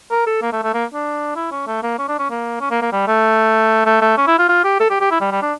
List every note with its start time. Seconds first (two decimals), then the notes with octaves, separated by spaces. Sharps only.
0.11 A#4
0.26 A4
0.42 A#3
0.53 A3
0.63 A3
0.74 A#3
0.94 D4
1.36 E4
1.52 C#4
1.67 A3
1.83 A#3
1.98 C#4
2.08 D4
2.19 C#4
2.30 A#3
2.61 C#4
2.71 A#3
2.82 A#3
2.92 G3
3.08 A3
3.86 A3
4.01 A3
4.17 C#4
4.27 E4
4.39 F4
4.49 F4
4.64 G4
4.80 A4
4.90 G4
5.01 G4
5.11 E4
5.21 G3
5.31 G3
5.42 D4